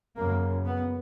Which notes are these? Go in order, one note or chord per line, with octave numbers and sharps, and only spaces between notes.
F#2 C#3 A#3
B3